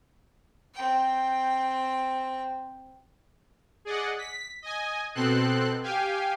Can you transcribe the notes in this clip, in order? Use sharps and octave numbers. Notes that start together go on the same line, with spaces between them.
C4 G5
G#4 D5 D#5 F#5
B6
D#5 G#5
B2 C4 A4 C6 F#6
G4 F5 G5 G#5